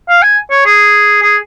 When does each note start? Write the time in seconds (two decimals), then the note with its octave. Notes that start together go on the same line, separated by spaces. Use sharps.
0.09 F5
0.22 G#5
0.51 C#5
0.66 G#4
1.22 G#4